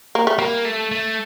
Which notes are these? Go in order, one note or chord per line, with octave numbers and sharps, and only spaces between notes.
A#3
A3
G3 A#3
A3
A3